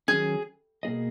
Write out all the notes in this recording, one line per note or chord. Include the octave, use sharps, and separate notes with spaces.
D#3 F#3 C#4 G#4
B2 A#3 C#4 G#4 D#5